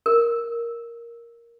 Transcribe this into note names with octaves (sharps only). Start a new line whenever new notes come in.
A#4